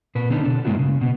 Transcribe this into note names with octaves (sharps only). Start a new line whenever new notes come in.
A#2 B4
D3 B3 C#4 D#4
B2 D3 D4
G2 G#3 A#3 D4 E4 F#4
C#3
B2 B3